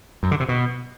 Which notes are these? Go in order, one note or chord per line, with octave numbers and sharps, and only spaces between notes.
F#2
D3
C3
B2